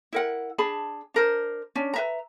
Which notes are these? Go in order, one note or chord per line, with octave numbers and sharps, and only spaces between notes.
E4 A#4 F#5
D4 G#4 A5 B5
D4 A#4 C5
C#4 D4
B4 E5 A#5